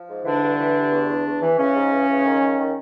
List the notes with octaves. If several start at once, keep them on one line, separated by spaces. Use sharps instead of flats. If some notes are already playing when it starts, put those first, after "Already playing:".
Already playing: F3
G#2
D3 E3 D4
G2
E3
G2
E2
E2
E2
E3
C#3 E3 C#4
G#2
E3
E3
D#3
D#3
D#3